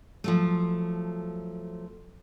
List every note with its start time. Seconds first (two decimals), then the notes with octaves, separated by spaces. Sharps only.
0.24 F3 F#3 A3